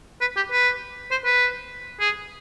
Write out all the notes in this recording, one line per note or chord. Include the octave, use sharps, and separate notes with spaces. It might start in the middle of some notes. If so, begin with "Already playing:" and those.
B4
G4
B4
C5
B4
G#4